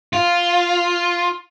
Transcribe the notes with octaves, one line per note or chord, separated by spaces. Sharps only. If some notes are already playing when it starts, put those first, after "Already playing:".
F4